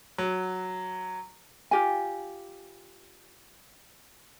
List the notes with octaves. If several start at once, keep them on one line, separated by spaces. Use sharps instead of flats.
F#3
F4 G4 G#5